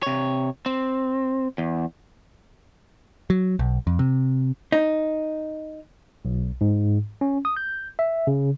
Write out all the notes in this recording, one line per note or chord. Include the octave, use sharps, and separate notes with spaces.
C3 C#5
C4
E2
F#3
B1
F2
C3
D#4
B1
G#2
C#4
D#6
G6
E5
C#3